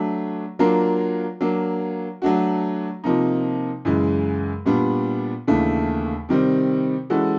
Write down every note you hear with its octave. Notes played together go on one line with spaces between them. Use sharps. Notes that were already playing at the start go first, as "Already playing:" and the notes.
Already playing: F#3 A3 D4
F#3 A#3 D4 F4 A#4
F#3 A#3 D4
F#3 A3 D4 F#4
C3 F3 A#3 D#4
F#2 C#3 E3 G#3
A#2 G3 B3 D4
D#2 C#3 E3 A3 D4
C3 D#3 G3 C4
E3 G#3 C#4 F#4 A4